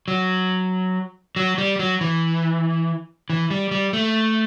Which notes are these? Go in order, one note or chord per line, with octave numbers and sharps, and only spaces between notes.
F#3
F#3
G3
F#3
E3
E3
G3
G3
A3